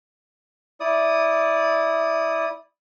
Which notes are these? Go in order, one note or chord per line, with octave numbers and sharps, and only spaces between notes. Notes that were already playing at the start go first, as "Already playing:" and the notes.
E4 D5 D#6